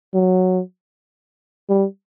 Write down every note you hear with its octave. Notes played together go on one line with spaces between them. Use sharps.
F#3
G3